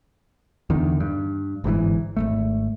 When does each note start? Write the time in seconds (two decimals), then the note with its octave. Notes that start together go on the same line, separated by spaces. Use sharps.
0.70 E2 D3 D#3
1.00 G2
1.64 G1 G#2 B2 E3
2.17 G#1 C#2 A3